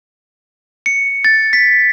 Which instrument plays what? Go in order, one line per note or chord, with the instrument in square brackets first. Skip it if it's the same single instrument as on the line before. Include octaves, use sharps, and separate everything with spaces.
[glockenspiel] C#7
A6
B6